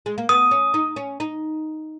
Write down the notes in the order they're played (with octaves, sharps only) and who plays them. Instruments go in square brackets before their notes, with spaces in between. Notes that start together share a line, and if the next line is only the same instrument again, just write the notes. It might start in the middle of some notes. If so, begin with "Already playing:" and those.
[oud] G#3
A#3
[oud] B3 [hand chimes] D#6
[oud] C#4
D#4
C#4
D#4